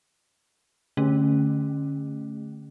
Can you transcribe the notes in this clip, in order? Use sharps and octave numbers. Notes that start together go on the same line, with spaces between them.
D3 A3 C#4